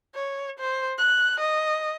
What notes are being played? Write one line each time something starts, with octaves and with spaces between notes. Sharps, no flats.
C#5
C5
F#6
D#5